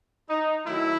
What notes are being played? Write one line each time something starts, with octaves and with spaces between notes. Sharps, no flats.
D#4
D#3 F#3 A3 E4